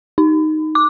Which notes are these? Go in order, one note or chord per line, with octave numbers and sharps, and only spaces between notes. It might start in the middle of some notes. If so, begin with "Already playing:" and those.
D#4
D6